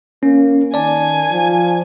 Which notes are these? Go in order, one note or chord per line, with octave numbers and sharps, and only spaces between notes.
A#3 C#4
D#3 D5 G#5 A5
F3